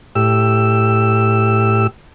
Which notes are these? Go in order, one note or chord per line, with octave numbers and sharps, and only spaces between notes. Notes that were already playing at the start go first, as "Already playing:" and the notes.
A2 G4 E6